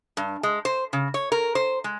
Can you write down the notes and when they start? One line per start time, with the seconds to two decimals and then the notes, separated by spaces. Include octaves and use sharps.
0.17 G2
0.43 G#3
0.65 C5
0.93 C#3
1.14 C#5
1.32 A#4
1.55 C5
1.84 G#3